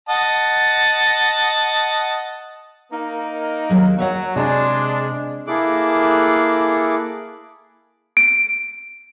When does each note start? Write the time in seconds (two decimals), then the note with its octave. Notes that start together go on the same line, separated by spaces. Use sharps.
0.09 D#5 F#5 A5
2.92 A#3 D#4 A#4
3.70 D#2 F#3 G#4
3.98 F#3 F#4 E5 F#5
4.36 C3 G#3 D4
5.47 A#3 E4 G#4 A4 D6 F#6
8.17 D7